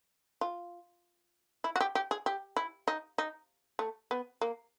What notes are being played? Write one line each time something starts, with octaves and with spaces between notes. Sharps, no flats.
F4
E4
F#4
G4
G4
G#4
G4
E4
D#4
D#4
A3
B3
A#3